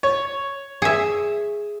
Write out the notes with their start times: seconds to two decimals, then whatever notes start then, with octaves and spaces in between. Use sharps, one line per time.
0.03 C#5
0.82 G#4 E5